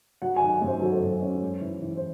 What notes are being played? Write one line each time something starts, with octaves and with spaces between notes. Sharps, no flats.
F#3 F#5
D#3 G#5
F#2
C5
F#3 A4
C5
F#2
C#4
G#3
E3
E3
C5